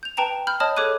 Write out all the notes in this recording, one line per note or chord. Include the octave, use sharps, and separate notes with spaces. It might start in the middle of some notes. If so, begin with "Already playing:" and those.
G6 F7
B4 G5 A5 A#5 F7
B5 F6 G6
C#5 D#5 A5 B5 D#6 F6
G#4 A4 C#5 D6 F#6 D#7